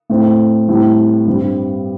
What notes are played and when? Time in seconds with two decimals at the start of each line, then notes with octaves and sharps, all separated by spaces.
0.10 A2 A3 C4
0.68 A2 G3 C4
1.26 G2 G3 C4